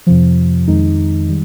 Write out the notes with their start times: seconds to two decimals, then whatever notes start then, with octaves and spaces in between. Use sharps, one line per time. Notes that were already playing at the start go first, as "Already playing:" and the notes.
0.07 F2 C3 F3
0.68 F2 D#3 G#3 D#4
1.29 D#3 G3